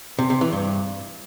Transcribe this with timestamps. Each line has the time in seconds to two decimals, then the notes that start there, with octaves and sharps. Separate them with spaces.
0.19 C3
0.30 C3
0.41 E3
0.52 G2